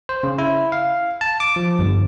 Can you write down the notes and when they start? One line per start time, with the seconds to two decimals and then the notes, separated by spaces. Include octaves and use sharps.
0.09 C5
0.23 C#3
0.38 E4
0.72 F5
1.21 A5
1.40 D6
1.56 F3
1.79 G1